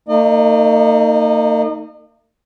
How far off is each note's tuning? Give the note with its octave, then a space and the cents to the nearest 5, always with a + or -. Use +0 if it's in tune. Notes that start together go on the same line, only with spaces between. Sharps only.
A#3 -45 D#4 +0 D#5 -40